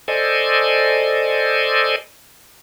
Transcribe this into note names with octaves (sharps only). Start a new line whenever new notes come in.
A4 C5 D5 D#5 G#5